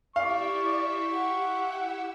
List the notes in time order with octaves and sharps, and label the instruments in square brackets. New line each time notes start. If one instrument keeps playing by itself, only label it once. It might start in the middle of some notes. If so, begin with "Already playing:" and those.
[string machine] E4 G4 E5 [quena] D5 [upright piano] F5 [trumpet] C#6
[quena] F#5